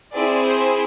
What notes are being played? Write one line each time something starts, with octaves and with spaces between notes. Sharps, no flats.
C4 E4 G#4 D5
C5